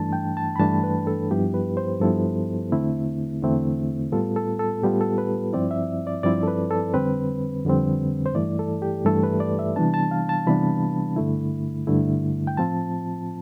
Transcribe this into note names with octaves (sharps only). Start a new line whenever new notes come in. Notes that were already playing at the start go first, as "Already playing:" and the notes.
Already playing: G2 E3 A3 D4 A5
G5
A5
B5
G2 E3 A3 D4 A5
B4
A4
G2 F3 B3 E4 G4
B4
C5
G2 F3 B3 E4 A4
E2 D3 A3 C4 E4
E2 D3 A3 C4 E4
A2 G3 B3 F4 A4
A4
A4
A2 G3 B3 F4 G4
A4
B4
G2 F3 C4 E4 D5
E5
D5
G2 F3 C4 E4 D5
A4
B4
A4
F2 D3 G3 C4 B4
F2 D3 G3 C4
C5
G2 E3 A3 E4 D5
A4
G4
G2 E3 A3 E4 A4
B4
D5
E5
C3 E3 G3 B3 D4 A5
A5
F5
A5
C3 E3 G3 B3 D4 B5
G2 D3 A3 E4
G2 D3 A3 E4
G5
A2 F3 C4 F4 A5